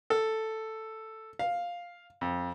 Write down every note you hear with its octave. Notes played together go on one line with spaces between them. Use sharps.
A4
F5
F2